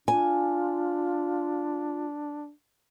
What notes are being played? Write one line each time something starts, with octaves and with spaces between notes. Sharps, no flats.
D4 F4 G#5